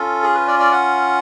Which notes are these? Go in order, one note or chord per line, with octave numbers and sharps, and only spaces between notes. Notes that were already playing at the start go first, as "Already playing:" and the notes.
Already playing: C#4 F4 A4
G#4
B4
D5
D5
F#5